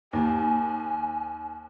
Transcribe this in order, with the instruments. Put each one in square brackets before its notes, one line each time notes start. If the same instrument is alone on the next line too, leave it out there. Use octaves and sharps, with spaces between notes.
[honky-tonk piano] D#2 [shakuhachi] G#5